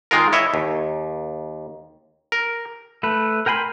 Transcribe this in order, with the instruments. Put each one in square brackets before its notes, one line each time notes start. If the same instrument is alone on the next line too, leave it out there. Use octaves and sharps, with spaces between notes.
[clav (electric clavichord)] D#3 G#3 F4 A#4
E4 C#5 D#5 E5
D#2
A#4
[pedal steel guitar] A3 B4
A#4 G5 G#5 B5 C6